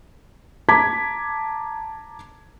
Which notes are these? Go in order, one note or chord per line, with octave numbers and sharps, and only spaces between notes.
A5 A#5 D6 G#6 B6